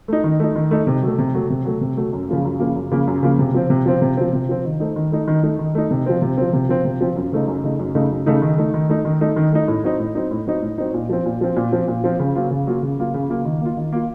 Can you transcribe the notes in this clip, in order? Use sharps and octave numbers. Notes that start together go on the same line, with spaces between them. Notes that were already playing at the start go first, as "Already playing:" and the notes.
A3 D#4
D#3
A3 D#4
D#3
A3 D#4
C3
F#3 A3
C3
F#3 A3
C3
F#3 A3
C3
F#3 A3
F#2
C#3 F3 A#3
F#2
C#3 F3 A#3
F#2
C#3 F3 A#3
F#2
C#3 F3 A#3
C3
F3 C4
C3
F3 C4
C3
F3 C4
C3
F3 C4
D#3
A3 D#4
D#3
A3 D#4
D#3
A3 D#4
D#3
A3 D#4
C3
F3 C4
C3
F3 C4
C3
F3 C4
C3
F3 C4
F#2
C#3 A3 D#4
F#2
C#3 A3 D#4
F#2
C#3 A3 D#4
F#2
C#3 A3 D#4
D#3
A3 D#4
D#3
A3 D#4
D#3
A3 D#4
D#3
A3 D#4
A2
F#3 C4 D#4
A2
F#3 C4 D#4
A2
F#3 C4 D#4
A2
F#3 C4 D#4
A#2
F3 C4
A#2
F3 C4
A#2
F3 C4
A#2
F3 C4
C#3
F#3 A#3 F4
C#3
F#3 A#3 F4
C#3
F#3 A#3 F4
C#3
F#3 A#3 F4
D#3
A#3 F4
D#3
A#3 F4